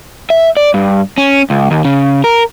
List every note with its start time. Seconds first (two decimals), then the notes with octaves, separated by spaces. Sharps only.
0.30 E5
0.57 D5
0.74 G2
1.18 C#4
1.50 C#2
1.71 D#2
1.85 C#3
2.24 A#4